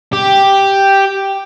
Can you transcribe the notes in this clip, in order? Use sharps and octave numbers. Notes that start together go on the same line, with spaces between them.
G4